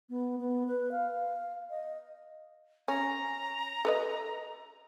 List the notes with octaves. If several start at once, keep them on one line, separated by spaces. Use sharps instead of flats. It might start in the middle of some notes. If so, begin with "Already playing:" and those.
B3
B3
B4
F5
D#5
C#4 A#5
A4 B4 D#5